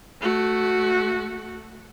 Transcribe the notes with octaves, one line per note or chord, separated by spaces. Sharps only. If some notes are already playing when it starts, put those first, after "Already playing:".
A3 F#4